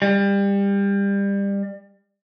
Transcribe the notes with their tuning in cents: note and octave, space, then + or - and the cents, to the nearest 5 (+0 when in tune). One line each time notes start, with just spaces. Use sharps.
G3 +25